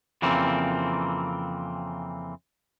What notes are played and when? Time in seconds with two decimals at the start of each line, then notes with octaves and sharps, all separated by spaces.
0.22 F2 C#3 E3 A#3 C4